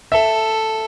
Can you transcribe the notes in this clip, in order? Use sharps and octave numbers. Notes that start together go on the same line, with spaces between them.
A4 E5